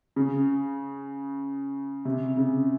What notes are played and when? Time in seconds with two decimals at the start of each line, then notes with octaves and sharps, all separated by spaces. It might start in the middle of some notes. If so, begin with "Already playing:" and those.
0.16 C#3
2.05 C3
2.37 C#3